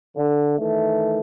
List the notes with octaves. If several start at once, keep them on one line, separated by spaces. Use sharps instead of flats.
D3
D#3 E3 A3